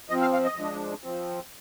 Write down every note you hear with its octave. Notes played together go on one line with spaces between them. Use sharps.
F3 C4 D#5
F5
F5
D#5
F3 G#3 D4
F3 C4